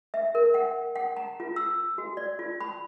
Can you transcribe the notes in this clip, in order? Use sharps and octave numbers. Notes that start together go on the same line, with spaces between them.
E5
A#4
F#5
F#5
A#5
F4
E6
F#4
D5
F4
B5